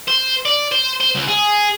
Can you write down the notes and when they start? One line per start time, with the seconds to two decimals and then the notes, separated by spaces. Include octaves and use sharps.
0.08 C5
0.46 D5
0.72 C5
1.01 C5
1.15 C#2
1.28 G#4